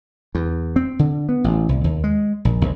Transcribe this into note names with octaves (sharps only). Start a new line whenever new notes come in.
E2
C4
D3
B3
A1
C2
D#2
G#3
A#1
A#1